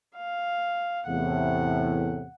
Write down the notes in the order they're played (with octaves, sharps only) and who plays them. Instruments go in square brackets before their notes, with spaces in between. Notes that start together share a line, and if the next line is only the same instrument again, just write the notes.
[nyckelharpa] F5
[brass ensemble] E2 A2 C3 [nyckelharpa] F#5